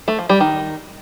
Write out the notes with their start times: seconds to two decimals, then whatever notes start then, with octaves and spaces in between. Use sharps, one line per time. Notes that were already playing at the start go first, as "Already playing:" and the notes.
0.08 A3
0.19 F3
0.29 G3
0.40 D#3